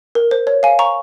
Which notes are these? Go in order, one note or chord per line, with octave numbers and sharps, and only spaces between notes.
A#4
C5
C#5
F5 G#5
A#5 C#6